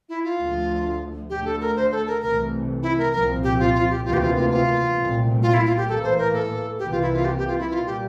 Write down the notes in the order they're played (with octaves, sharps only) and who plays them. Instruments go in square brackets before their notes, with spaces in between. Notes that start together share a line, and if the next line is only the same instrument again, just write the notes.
[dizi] E4
F4
[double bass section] D2 D3 F3 A3
[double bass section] D2 D3 A3 [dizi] G4
[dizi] A4
A#4
C5
A4
A#4
[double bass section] C2 C3 E3 A3 [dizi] A#4
[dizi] E4
A#4
[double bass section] C2 A#2 F3 C4 [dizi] A#4
[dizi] G4
F4
F4
G4
[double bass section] D2 C3 E3 A#3 [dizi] F4
[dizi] G4
F4
F4
F4
[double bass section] C2 A#2 A3 C4
[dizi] F4
E4
F4
G4
[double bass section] A2 E3 A#3 [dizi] A4
[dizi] C5
A#4
A4
[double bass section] C2 C3 E3 A#3 [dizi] G4
[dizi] F4
E4
F4
G4
G4
F4
E4
[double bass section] A#2 G3 A#3 [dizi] F4
[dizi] G4